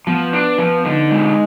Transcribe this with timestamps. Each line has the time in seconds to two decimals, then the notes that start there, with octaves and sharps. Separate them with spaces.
0.07 F3 B3
0.33 D4
0.58 F3
0.84 D3 D#4
1.11 G#3